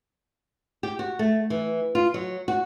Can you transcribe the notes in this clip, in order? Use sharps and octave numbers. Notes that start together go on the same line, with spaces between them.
G4
F#4
A3
E3
F4
F#3
F#4